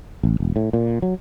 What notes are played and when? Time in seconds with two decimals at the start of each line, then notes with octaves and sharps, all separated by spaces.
0.23 A1
0.40 E1
0.56 A2
0.73 A#2
1.02 F#3